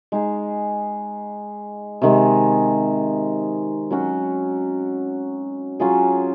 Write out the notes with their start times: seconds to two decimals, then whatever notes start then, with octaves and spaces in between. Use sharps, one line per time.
0.12 G#3 D#4 G#4
2.02 C3 D#3 G#3
3.91 F#3 C#4 F#4
5.80 F#3 C#4 F4 G#4